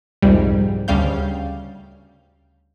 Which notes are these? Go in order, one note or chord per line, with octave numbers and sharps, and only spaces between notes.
C2 F2 G#2 G3
D2 C#3 G3 F5 G6